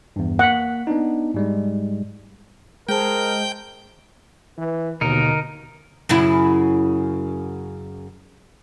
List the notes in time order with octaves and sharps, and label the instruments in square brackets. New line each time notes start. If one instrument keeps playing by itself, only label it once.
[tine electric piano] E2 G2
[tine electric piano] A#3 B6 [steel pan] F#5
[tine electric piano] B3 D4 D#4
G#2 G3 G#3
[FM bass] G#3 [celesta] G#4 C5 A5 [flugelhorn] A#4 [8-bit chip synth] G5 G6
[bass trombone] E3 [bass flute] B4
[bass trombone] D#2 [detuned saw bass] B2 [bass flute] D3 [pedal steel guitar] D#4 A#4
[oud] F#2 C#3 E4